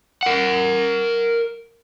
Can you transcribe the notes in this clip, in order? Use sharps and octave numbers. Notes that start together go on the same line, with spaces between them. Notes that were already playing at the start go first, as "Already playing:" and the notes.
A#4 F#5